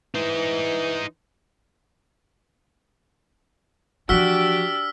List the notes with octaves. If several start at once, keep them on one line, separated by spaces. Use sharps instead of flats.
E3 D#4 C5
E3 F3 D4 F#4 G4 E6 F6 B6